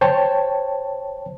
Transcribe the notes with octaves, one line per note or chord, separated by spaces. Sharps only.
C5 C#5 G5 A5